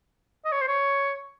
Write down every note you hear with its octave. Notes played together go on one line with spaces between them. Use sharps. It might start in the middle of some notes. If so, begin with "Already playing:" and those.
D#5
C#5
C5
C#5